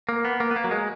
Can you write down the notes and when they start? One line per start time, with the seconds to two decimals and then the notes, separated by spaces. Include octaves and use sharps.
0.09 A#3
0.25 B3
0.40 A#3
0.51 B3
0.56 A#3
0.64 F#3
0.71 G#3